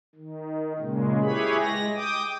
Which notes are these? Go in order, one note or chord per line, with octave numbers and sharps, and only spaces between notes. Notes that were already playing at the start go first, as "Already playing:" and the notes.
D#3
A#2 C#3 G#3
E4 G4 G#4 B4 C#5 B5
G#3 A#6
G5 D6 D#6